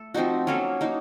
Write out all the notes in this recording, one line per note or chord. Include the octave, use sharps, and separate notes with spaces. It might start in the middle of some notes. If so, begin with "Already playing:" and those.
Already playing: A3 A4
F3 C4 D#4 F#4
F#3 A#3 C#4 A4
A#3 D#4 F#4